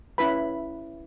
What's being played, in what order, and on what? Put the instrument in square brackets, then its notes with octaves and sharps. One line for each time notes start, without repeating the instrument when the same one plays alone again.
[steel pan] C#4 E4 B4 B5